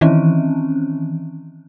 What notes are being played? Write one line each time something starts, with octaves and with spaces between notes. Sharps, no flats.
D#3 E3 C4 C#4